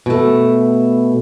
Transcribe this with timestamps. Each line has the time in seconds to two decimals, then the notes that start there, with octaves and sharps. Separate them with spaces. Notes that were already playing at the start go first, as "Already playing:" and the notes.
0.06 B2 A3